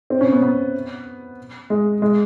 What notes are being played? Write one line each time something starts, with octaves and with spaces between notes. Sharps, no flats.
C4
C#4
B3
B3
G#3
G#3